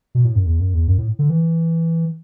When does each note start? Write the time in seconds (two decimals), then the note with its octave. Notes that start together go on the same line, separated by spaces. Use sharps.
0.15 B2
0.25 A2
0.36 F#2
0.46 E2
0.60 F#2
0.74 E2
0.88 F#2
0.98 A2
1.19 D3
1.30 E3